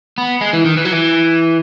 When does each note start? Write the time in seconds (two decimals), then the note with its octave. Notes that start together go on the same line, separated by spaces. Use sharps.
0.18 B3
0.41 G#3
0.53 E3
0.65 D#3
0.77 E3
0.85 F#3
0.93 E3